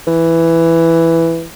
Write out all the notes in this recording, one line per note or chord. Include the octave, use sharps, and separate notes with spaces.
E3